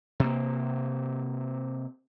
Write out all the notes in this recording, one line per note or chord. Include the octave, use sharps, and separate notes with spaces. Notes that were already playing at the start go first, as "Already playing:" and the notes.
C3 A#3